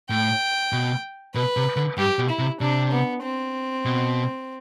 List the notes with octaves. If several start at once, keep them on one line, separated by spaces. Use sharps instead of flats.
A2 G5
B2
B2 B4
C3
D3
G2 G4
B2
E4
C3
C3 D4
B3
C4
B2